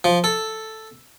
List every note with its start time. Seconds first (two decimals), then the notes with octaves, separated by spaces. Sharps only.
0.04 F3
0.24 A4